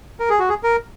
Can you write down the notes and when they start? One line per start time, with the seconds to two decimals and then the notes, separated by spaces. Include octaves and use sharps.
0.20 A#4
0.30 G#4
0.39 F#4
0.49 G#4
0.63 A#4